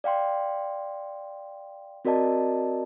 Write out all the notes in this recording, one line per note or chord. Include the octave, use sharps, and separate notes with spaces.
D5 F5 G5 C6
C4 F#4 A#4 D5 D#5 A5